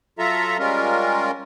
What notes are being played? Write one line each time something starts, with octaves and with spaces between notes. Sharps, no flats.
F#3 F4 A4 E5 A#5
G3 G#3 C#4 F4 A#4